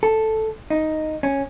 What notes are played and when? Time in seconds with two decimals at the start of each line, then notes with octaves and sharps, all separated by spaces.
0.03 A4
0.70 D#4
1.23 C#4